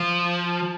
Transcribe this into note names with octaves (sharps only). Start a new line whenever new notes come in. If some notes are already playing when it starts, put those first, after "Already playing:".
Already playing: F3